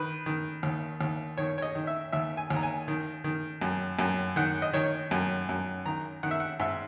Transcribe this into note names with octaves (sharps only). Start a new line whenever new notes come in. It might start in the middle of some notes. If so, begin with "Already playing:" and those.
Already playing: D#3 B4
D#3
D#2
D#2
D#3 C#5
C#5
D#5
D#3
E5
D#2 E5
G#5
D#2
A#5
G#5
D#3
D#3
F#2
F#2
D#3 F#5
D#5
D#3 C#5
F#2
F#2
D#3 A#5
D#3 F#5
E5
F#5
G#2 E5